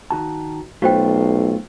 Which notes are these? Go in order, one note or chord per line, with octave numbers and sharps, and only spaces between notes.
D#3 F#4 A5
B1 A3 F4 F#4 C5 G5